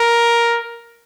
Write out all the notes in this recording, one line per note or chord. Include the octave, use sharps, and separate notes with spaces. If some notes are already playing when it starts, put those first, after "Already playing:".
Already playing: A#4